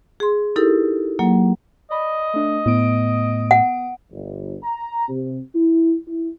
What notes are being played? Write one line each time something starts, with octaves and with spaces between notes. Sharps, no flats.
G#4 C6
D#4 E4 G4 A4 A#4
F#3 A#3
D5 D#5 B5
A3 D4
A2 B3 D#6 D7
F#5
G1
A#5
C3
E4
E4